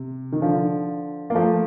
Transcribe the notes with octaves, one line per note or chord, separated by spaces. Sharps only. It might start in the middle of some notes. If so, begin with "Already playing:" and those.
Already playing: C3
D#3
D3 F3
A#3
F3 A3